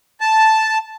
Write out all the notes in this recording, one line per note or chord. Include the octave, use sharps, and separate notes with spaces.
A5